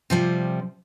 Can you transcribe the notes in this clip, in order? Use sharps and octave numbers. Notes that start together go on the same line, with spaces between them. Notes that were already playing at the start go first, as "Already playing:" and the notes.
C3 F3 G3